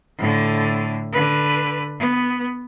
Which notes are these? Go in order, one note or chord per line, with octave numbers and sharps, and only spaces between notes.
A2 D3
D3 B4
B3